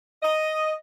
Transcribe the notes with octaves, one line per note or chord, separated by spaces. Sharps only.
D#5